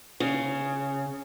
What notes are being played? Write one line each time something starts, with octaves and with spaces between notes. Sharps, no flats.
C#3